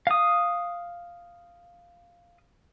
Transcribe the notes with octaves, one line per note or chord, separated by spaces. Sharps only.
F5 D#6